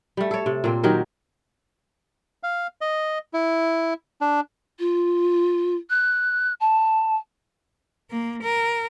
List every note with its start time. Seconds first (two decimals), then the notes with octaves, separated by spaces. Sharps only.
0.17 G3 A3
0.31 A4 C#5
0.46 C3
0.64 A#2 A#3 C4
0.83 D#3 F#3 G4 A#4
2.43 F5
2.81 D#5
3.33 E4
4.21 D4
4.79 F4
5.90 F#6
6.60 A5
8.10 A#3
8.43 A#4